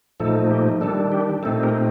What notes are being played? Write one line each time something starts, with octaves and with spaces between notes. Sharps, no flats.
A#2 F3 A3 D#4 A4
G4
D#3 G3 D4 A4
G4
A#2 A3 C4 D#4 A4
G4 A#4